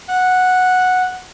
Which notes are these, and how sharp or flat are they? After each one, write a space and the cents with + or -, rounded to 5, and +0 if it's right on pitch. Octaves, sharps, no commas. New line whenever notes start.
F#5 -5